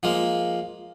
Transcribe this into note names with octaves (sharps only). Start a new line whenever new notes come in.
F3 G#3 A#3